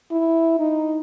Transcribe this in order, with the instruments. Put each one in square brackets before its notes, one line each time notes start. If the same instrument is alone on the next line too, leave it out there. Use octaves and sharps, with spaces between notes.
[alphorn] E4
D#4